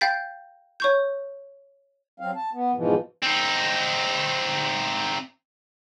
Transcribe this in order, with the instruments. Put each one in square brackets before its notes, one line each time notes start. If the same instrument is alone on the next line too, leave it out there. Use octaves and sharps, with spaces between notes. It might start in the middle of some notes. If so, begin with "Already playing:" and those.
[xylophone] F5 G5 G6 A6 B6
C#5 C#6 G6
[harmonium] F#3 C4 F5
A5
B3
G#2 B2 E3 F3
[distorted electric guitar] C4 D#4